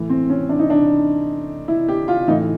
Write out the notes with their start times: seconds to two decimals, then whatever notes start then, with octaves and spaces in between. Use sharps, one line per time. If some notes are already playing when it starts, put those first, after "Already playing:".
Already playing: A2 E3
0.10 C4
0.30 C#4
0.49 D4
0.59 D#4
0.70 D4
1.68 E4
1.89 G4
2.08 F4
2.28 A2 E3 D#4